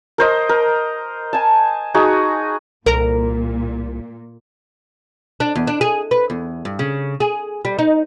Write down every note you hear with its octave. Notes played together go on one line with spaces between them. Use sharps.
A#4 C5 D#5
A#4
G#5 A5
D#4 F#4 G#4
C2 A#2 A#4
D4
E2
D4
G#4
B4
E2
G2
C#3
G#4
G3
D#4